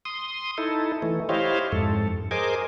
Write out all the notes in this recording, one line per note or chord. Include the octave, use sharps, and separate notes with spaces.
C6 D#6
D#4 E4 A4
E3 A3
E4 G4 C5 C#5 D#5 F5
F2 G#2 A4
G#4 A#4 C5 D#5 G#5 D6